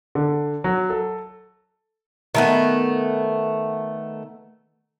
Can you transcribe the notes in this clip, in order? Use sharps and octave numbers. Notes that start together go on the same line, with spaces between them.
D3
F#3
A4
D#3 A3 B3